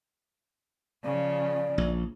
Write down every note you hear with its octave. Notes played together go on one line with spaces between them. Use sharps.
C#3 F3 D5
A#1